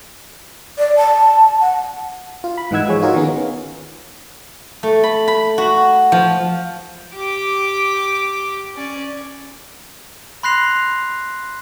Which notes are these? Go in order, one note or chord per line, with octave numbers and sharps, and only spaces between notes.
D5
A5
F#5
F4
B5
G#2 E3 D#4 F#5 E6 G#6
F3 G#4 C#5
D#4 F4 F#4 G#4 A#4 C#5
D#3 B3 C#4
A3
B5
B5
F#4
F3
G4 D6
C#4 D5
B5 C6 F#6 A#6 C7 F7